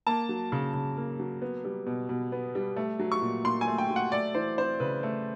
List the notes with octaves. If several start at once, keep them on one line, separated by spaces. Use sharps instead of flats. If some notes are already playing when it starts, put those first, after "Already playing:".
A#3 A5
F#3
C#3
C#3
A#3
F#3
B3
G3
B2
B2
B3
G3
A3
F#3
C#6
A#2
A#2 C6
G#5
A3
G5
F#3
F#5
A3 D5
E3 C5
C4 C5
C#3 B4
A3